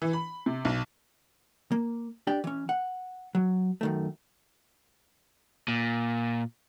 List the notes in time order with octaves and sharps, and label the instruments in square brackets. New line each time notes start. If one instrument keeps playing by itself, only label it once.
[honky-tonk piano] E3
B5
C3
B1
[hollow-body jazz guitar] A#3
D4 G4 D5 G5
E3 C#4
F#5
F#3
F#2 D#3 A3
[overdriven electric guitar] A#2